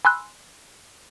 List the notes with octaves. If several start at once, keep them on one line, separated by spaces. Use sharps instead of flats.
G#5 B5 C6 E6 F#6